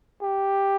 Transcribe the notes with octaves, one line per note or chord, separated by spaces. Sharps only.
G4